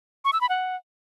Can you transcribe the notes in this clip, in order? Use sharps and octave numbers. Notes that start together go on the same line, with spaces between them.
C#6
E6
B5
F#5